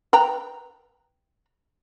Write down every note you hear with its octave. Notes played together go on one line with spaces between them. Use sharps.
B4 G5 A#5